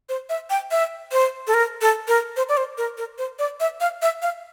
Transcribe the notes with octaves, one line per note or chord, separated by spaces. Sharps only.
C5
E5
G5
E5
C5
A4
A#4
A4
A#4
C5
D5
C5
A#4
A#4
C5
D5
E5
F5
E5
F5